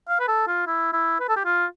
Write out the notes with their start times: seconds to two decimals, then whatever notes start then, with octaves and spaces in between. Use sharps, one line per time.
0.09 F5
0.20 B4
0.28 A4
0.47 F4
0.67 E4
0.93 E4
1.20 B4
1.29 A4
1.36 G4
1.45 F4